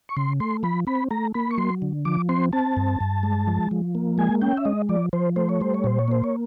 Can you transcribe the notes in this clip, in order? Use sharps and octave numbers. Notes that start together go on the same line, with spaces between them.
C#6
C#3 C6
A3 C6
F3 B5
C4 B5
A3 A#5
A#3 B5
C#6
F#3 C6
D3
F3 D6
C4 C6
C4 A5
G2
G2
G#3
F3
F3
A#3
G#3 G#5
C#4 G5
E5
G#3 D#5
F3 D5
F3 C5
A3 C5
C#5
G3 C5
C#5
A#2 C5
C#5
A#3 C5
C#5